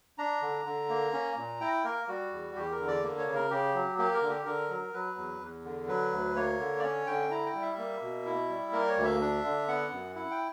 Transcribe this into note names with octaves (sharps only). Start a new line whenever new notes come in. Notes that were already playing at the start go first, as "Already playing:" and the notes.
D4 A#5
D3
D3
A#3
C#4
A#2
E4 G5
A#3 A#4
G3 F#4
E2
E2 G4
A#4
D3
D5
A#3
C#5
C#3
A#4
C#3 G4
F#3
A#3 G4
A#4
D3
G4
D3 A#4
F#3
F#3 B4
E2
E2
D3
F#3 B4
D2
A#3 C#5
D3
D5
C#4 C#5
D3 G5
E4 A#5
G5
G3
E5
A#3
B2
E4
G3
A#3 A#4
C#5
D2
E5
D4
D3
B3 F#5
F#2
E4 F#5
G5